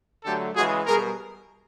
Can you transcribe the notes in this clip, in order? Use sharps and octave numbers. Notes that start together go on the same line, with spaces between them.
D3 F#3 A3 G4 A4
C#3 E3 G#3 F#4 G#4
B2 G3 G#4 A#4